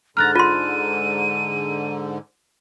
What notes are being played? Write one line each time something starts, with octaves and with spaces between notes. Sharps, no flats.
G#2 D3 A#5 F6 F#6 A6
F4 C6 D#7